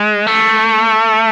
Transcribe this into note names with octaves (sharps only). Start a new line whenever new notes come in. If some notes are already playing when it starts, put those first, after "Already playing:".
Already playing: G#3
A3